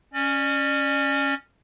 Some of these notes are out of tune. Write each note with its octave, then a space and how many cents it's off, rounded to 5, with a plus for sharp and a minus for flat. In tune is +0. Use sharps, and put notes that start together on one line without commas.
C#4 +0 D5 +35